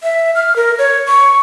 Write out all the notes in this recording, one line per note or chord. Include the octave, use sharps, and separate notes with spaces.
E5
F6
A#4
C#5
C#6